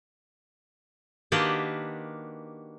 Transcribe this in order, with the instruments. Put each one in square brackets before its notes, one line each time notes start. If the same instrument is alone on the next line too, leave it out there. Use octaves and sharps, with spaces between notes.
[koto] D#3 A#3 D4 F#4 G4 B4